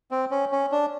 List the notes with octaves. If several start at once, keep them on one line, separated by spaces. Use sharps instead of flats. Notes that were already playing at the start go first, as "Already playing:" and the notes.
C4
C#4
C#4
D4